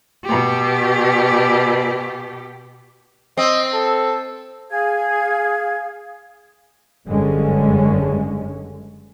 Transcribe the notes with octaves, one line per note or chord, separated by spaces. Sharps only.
B2 G4
C4 D#5
A4
G#4 F5 G#6
F#1 G2 D3 G3 G#3 C#4